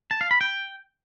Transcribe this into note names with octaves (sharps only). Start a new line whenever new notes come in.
A5
F5
B5
G5